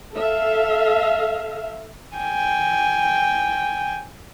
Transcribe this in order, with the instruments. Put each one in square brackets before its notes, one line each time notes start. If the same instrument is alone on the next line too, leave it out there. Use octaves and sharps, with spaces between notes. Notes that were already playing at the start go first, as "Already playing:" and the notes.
[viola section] A4 E5 F5
[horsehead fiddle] G5 G#5